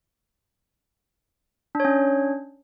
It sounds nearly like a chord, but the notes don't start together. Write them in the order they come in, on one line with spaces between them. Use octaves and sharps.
D4 C#5 C#4